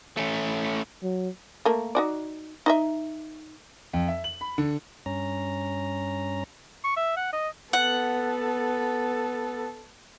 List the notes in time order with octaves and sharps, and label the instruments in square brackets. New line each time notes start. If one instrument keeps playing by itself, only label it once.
[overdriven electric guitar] A3 C#4
[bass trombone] F#3
[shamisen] A3 A#3
D#4 F#4 D5
D#4 D#5 E5
[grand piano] F2
E5
F#7
B5
D3
[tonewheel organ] G2 C#4 A#5
[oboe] C#6
E5
F#5
D#5
[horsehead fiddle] B3 A4 [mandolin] F#5